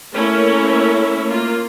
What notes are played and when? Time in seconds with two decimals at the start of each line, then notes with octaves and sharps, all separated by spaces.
0.12 A3 A#3 C#4 E4 A#4 C#5
1.26 A#3 F4